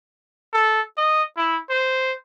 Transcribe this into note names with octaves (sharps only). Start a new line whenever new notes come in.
A4
D#5
E4
C5